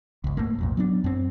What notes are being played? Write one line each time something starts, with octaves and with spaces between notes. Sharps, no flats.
G1 C#2
G#2 A3 A#3
B1 F2 A#2
F#3 B3 D4
F#2 C4